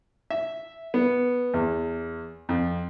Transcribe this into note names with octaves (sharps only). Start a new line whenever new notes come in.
E5
B3
E2
F2